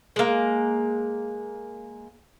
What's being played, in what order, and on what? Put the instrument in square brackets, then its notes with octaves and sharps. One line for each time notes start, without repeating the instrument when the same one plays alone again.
[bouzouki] G#3 A#3